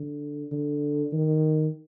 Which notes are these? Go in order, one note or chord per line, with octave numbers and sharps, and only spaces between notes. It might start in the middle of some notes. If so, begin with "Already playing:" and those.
Already playing: D3
D3
D#3